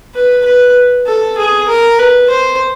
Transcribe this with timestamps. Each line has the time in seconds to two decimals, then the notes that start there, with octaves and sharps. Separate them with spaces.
0.14 B4
0.45 B4
1.07 A4
1.37 G#4
1.69 A#4
1.99 B4
2.30 C5